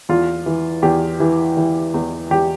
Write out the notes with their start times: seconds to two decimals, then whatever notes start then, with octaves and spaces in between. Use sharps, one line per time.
0.09 E2 F4
0.46 E3
0.82 E2 G4
1.20 E3
1.57 E3
1.94 E2
2.30 E2 G4